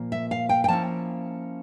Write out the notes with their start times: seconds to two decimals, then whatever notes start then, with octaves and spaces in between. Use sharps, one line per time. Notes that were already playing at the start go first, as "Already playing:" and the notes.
Already playing: A#2 F3 A#3
0.12 E5
0.31 F5
0.49 G5
0.64 G5
0.68 F3 A#3 C#4 E4 A5